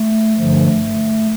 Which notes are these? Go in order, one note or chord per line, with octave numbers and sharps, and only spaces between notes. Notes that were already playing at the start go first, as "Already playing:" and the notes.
Already playing: A3
G2 D3 F3 A3
A3